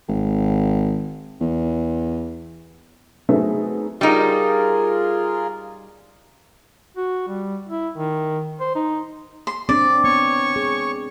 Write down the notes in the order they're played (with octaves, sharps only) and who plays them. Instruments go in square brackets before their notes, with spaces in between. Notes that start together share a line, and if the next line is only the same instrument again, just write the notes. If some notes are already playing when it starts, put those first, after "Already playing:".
[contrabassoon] G#1
E2
[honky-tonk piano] F#3 A3 B3 C4 D#4 G#4
[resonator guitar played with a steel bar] G3 D#4 [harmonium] F4 G#4 A#4
[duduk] F#4
G3
E4
D#3
C5
D#4
[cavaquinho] C6
[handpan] C4 D4 [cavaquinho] D5
[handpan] B3 [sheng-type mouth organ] C#5 C#6
[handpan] G#4